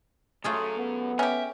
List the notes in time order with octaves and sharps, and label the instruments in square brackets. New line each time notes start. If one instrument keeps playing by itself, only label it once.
[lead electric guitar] F#2 F#3 [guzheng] A3 F4 G#4
[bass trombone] B3
[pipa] C#4 G4 [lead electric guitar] E5